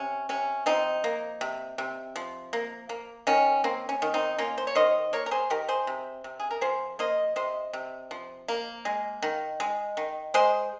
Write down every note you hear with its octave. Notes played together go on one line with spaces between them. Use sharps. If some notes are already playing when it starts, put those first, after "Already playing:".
Already playing: C3 C#4
C3 C#4
F3 C4 D#4
A#3
C3
C3
F3
A#3
A#3
D#3 C#4
A#3 C4
C#4
D#3
C4 D#4
A#3 C#4 F4
C5
C#5
D#3 C5 D#5
A#3 A#4 C#5
A#4
G#4 C5
D#3 G4 A#4
G#4 C5
C3
C3
G#4
A#4
F3 G#4 C5
A#3 C5 D#5
C3 C5 D#5
C3
F3
A#3
G#3
D#3
G#3
D#3
G#3 G#4 C5